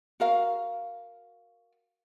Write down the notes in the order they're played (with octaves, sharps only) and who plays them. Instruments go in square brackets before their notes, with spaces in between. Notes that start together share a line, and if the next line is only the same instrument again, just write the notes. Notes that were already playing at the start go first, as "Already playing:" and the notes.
[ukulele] F#4 A#4 F5